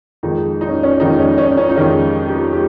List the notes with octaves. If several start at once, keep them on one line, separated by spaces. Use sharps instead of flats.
F2 D#3 G#3 D#4
D#4
C#4
C#4
F2 D#3 G#3 D#4
C#4
C#4
C#4
D#4
F2 D#3 G#3 C#4
G4
G#3 G4